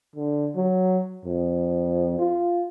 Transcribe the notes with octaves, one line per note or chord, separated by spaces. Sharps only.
D3
F#3
F2
F4